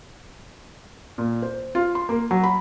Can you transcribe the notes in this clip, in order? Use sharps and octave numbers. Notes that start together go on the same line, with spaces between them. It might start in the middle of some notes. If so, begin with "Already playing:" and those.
A#2
C5
F4
C6
A#3
F#3
B5